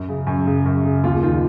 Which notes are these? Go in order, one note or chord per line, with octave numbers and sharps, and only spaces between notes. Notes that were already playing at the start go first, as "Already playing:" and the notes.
Already playing: F#2
C#3
F#2
C#3
F#2
C#3
D#2 F4
D#3 F4